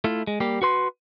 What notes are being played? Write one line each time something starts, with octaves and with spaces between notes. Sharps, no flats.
A3 E4 F4
G#3
G3 A#3 G4
F#4 B4 C6